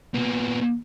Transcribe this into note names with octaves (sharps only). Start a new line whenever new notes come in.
A#2 B3